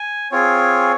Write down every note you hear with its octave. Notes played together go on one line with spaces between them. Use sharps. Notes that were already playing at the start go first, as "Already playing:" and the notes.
Already playing: G#5
C4 F4 G#4 C#5